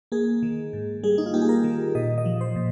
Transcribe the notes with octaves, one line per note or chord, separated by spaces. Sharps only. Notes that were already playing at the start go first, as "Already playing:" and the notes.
A#3 G#4
D#3
G#2
G3 G#4
D#4
F4
A#3 G4
G#4
A#4
D#3
A#2 D#5
D#5
F3
C5
A#2